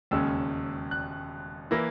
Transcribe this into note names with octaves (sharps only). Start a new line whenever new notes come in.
E1 D#2 C#3 G#3 C#4 E6
F#6
E3 A#3 E4 A#6